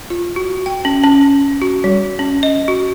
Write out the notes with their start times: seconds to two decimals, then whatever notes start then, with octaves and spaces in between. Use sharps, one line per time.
0.10 F4
0.36 F#4
0.66 G5
0.85 C#4
1.03 C#4
1.62 F#4
1.84 G3
2.19 C#4
2.43 D#5
2.68 F#4